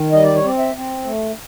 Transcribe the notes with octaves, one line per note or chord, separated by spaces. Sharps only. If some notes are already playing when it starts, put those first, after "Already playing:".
Already playing: D#3
G3 D#5
D5
C#5
C4 D5
E5
C4
A3